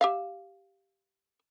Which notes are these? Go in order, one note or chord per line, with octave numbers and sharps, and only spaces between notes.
G4 E5 F5